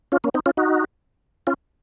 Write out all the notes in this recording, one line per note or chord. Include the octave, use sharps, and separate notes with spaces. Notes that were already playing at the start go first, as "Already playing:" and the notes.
C#4 F4
A#3 C#4
C4 D#4
C#4 F4
D#4 F#4
C#4 F4